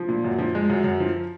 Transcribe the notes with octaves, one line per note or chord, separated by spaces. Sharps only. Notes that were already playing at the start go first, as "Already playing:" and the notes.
Already playing: F3
A#2
F#2
F3
G#3
F#2
F#2
F3